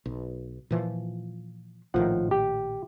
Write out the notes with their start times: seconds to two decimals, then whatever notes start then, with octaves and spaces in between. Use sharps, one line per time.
0.06 B1
0.71 A#2 E3 F3
1.94 A#1 A2 D#3 F3 F#5
2.31 G4